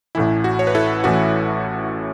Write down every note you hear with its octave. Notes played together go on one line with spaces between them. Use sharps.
A1 A2 E3 E4
F#4
C#5
B4
E4 A4
A1 A2 E3 F#4 B4